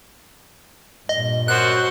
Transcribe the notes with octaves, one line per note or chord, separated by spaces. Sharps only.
G2 A#2 D#5
F#2 F#4 C5 F#6